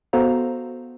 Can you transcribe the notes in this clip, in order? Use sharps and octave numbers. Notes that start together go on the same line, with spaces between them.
B3 F#4 A4 C5 F5 A#5